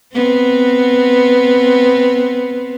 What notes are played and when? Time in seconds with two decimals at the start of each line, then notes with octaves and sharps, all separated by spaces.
0.13 B3 C4